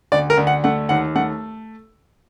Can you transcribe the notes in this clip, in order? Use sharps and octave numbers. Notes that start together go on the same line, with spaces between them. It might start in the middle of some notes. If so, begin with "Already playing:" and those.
D2 D5
A#4
D2
F#5
A3 F#5
D#2 F#5
A3 F#5